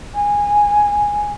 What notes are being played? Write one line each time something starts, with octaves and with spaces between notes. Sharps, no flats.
G#5